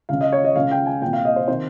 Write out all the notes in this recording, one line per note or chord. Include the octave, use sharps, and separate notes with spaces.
C#2 C#3 F5
D#5
C#5
D#5
C#2 C#3 F5
G5
G#5
C2 A#2 G5
F5
D#5
C5
C3 D#3 C5